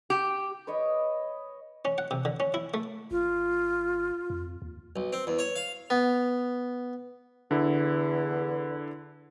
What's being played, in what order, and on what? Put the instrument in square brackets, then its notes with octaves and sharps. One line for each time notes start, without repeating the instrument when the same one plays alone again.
[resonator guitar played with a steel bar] G4
[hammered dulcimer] B4 C#5 D#5
[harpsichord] C#4
F#5
C3
D3
C#4
E4
A3
[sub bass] G#1 [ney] F4
[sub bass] F2
D#2
[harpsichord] B1
C4
E2
C#5
F5
B3
[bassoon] E2 [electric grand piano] D3 E4